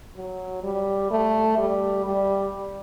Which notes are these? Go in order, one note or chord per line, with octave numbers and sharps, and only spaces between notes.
F#3
G3
A3
G3
G3